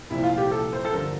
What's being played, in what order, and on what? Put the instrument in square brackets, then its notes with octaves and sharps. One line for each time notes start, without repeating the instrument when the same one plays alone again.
[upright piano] C2 A#2 F3 E4
F4
G4
A4
C5
A4
G2 D3 F3 A#4